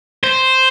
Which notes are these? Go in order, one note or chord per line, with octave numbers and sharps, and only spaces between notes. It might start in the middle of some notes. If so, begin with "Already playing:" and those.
C5